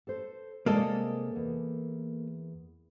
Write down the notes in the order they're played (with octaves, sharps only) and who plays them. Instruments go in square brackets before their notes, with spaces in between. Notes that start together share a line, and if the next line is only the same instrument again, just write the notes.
[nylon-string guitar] A4 C5
[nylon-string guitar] C3 G#3 D5 [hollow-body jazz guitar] A#3 A4 D#5
[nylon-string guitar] E2